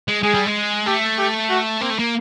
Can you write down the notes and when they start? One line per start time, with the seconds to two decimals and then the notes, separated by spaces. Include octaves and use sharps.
0.08 G#3
0.23 G#3 G#4
0.34 G3
0.46 G#3
0.86 A3 G4
1.18 G4
1.50 F#4
1.81 A#3 C4
1.90 A3
1.99 A#3